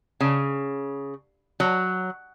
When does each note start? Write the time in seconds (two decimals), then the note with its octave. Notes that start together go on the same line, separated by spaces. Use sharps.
0.21 C#3
1.60 F#3